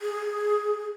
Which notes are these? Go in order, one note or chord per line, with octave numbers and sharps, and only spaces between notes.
G#4